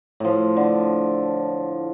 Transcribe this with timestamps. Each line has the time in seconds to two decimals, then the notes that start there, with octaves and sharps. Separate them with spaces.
0.20 A2 F3
0.57 D3